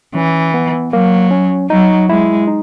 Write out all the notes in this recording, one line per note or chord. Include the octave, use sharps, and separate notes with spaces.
E3 C#4
B3
F#3 A#3
C#4
F#3 D#4
G#3 E4
D#4